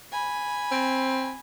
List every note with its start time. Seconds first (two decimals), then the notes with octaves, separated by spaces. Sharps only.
0.12 G#5 B5
0.71 C4